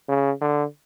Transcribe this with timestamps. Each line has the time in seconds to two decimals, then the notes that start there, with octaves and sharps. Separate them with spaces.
0.09 C#3
0.41 D3